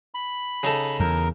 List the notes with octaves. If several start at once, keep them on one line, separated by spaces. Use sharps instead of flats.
B5
C#3 D#4 A4
E2 A#4